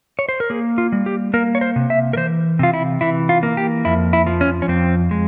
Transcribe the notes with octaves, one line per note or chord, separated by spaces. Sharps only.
C#5
C5
A#4
A#3 G#4
F4
G3
G4
A#3 A#4
C#5
C5
C3
E5
A#4
E3 C5
C3 F4
E4
E3 E4
F4
A#3
G4
F2 E4
E4
F3
C#4
C#4
F2 C4
G#3